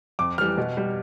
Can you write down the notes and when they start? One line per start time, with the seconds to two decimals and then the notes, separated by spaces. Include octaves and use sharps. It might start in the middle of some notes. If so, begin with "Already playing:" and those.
0.19 F2 D6
0.38 E3 G3 F6
0.58 B2
0.77 G3